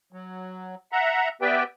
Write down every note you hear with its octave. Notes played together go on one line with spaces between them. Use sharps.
F#3
E5 F#5 A#5
B3 G4 B4 D5 E5 G5